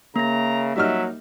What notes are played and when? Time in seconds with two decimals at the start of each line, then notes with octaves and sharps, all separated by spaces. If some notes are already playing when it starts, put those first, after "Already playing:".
0.16 C#3 A#3 A#5 A#6
0.76 F#3 G3 D#4 E5 F6